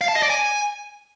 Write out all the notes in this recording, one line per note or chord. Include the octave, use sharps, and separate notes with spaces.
F5
A5
D#5
D5
G#5